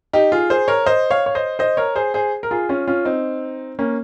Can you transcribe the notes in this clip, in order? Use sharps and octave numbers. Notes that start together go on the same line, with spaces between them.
D#4 G4
F4 G#4
G#4 C5
A#4 C#5
C5 D#5
C#5 F5
C#5
C5 D#5
C5 D#5
A#4 C#5
G#4 C5
G#4 C5
A#4
F4 G#4
C#4 F4
C#4 F4
C4 D#4
A#3 C#4